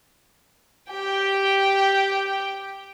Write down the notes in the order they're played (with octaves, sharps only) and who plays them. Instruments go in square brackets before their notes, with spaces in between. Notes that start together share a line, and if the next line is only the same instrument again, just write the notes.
[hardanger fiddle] G4 G5